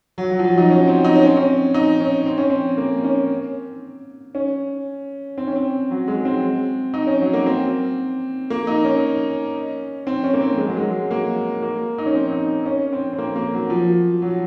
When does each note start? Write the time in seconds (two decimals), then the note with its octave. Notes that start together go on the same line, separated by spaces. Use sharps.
0.18 F#3
0.31 F#3
0.39 F3
0.44 F#3
0.58 D#4
0.70 C#4
0.87 C4
1.05 D#4
1.16 C#4
1.26 C4
1.37 C#4
1.74 D#4
2.00 C#4
2.26 C4
2.38 C#4
2.50 C4
2.77 A#3
3.04 C#4
4.35 C#4
5.38 C4
5.47 C#4
5.56 C4
5.91 F#3
6.08 G#3
6.25 C4
6.94 D#4
7.07 C#4
7.21 F#3
7.33 A#3
7.46 C4
8.50 A#3
8.67 D#4
8.85 C#4
10.07 C4
10.24 C#4
10.34 A#3
10.41 C4
10.58 G#3
10.67 F#3
10.77 G#3
11.11 A#3
11.62 A#3
11.98 D#4
12.06 C#4
12.15 C4
12.32 D#4
12.66 C#4
12.92 C4
13.13 C4
13.18 A#3
13.36 A#3
13.54 F#3
13.70 F3
14.22 F#3